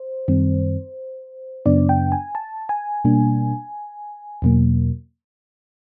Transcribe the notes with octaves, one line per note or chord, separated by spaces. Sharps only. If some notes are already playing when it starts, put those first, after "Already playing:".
Already playing: C5
F#2 D#3 G3 C4
F#2 C#3 F#3 B3 D4 D5
G5
G#5
A5
G#5
B2 G3 A#3 D4
E2 B2 F#3 A#3